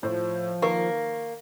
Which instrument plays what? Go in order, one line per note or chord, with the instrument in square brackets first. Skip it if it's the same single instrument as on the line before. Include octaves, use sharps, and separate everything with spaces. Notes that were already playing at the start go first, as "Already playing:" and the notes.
[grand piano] A2 C5 [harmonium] F3
[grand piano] D#3 [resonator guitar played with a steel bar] A#3 [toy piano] A#4 B4 C#6